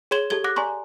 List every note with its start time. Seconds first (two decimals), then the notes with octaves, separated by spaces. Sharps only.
0.11 G#4 C#5 C6 G#6 E7 G7
0.30 G4 A4 G#6 G7
0.44 F#5 D6 F#6 A#6
0.56 D5 G#5 A#5 C6 C#6